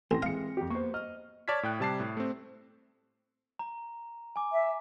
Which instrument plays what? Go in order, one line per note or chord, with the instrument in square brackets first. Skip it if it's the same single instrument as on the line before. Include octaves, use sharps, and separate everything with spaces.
[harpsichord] A1 [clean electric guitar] C4 [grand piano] C6 A#6
[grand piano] E3 G#3 C#7 [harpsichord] F5
[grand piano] F2 G4
[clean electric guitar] A#3 B3 [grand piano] C5 C#6
[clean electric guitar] D#5 [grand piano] F6
[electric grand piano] C#5 D5 A5 F6 G#6 B6
A2 G5 F#6
C3 G3 A5 D6 C7
A2
A3 C4
[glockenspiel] A#5
G#5 D6
[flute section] E5